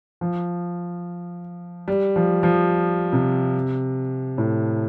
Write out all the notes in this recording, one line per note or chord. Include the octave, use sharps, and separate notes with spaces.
F3
G3
F3
F3
C3
A2